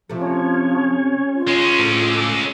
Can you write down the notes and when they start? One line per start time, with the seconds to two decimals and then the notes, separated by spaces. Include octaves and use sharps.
0.10 C3 F3 A3
0.21 C#4 C#5
1.34 F4
1.47 G#3 C#4
1.79 A2 F3 A4 D6